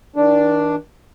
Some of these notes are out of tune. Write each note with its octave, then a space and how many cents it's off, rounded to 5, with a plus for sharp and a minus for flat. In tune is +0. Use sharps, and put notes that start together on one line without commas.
D#3 +35 D4 +0